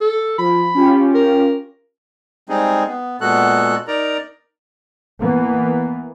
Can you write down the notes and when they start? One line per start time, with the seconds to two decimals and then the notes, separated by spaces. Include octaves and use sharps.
0.01 A4
0.38 F3 B5
0.75 C#4 F4 G4
1.14 A#4
2.49 G3 G#3 C4 D#4 G#4
2.87 B3
3.21 A#2 G#3 B3 F#4 A4 F#6
3.88 D#4 A#4 D5 A#5
5.18 E3 A#3 B3